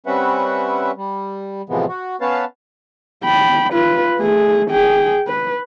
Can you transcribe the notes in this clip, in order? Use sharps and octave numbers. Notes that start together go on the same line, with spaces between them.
G3 C4 C#4 B4 E5 F#5
G3
A2 C3 E3 F3 G#3 B3
F#4
B3 C#4 B4 C#5 F5 A5
G5 B5
F4 B4
A3 G#4
G#4 G5
B4